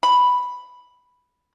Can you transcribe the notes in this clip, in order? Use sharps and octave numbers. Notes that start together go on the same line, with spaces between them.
B5